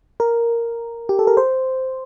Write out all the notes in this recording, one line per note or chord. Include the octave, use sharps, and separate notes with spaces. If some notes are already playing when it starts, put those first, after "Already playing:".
A#4
G4
A4
A#4
C5